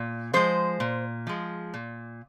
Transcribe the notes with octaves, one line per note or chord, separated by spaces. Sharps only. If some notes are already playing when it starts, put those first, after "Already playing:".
Already playing: A#2
F3 G#3 C5
A#2
F3 G#3
A#2